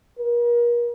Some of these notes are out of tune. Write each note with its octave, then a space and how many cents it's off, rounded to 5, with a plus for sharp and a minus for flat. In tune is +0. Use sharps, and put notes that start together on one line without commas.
A#4 +40